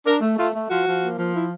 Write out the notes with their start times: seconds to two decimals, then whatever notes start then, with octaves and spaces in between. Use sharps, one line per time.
0.06 D4 A#4
0.21 A3
0.38 A3 F4
0.54 A3
0.69 F3 F#4
0.86 F3
1.02 A#3
1.18 F3
1.34 E4